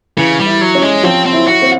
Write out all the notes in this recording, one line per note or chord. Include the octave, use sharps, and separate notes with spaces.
C#3 E3
G3
E4
F#3
C#4
G#3
F3 C4
C4
E4
F#4
C4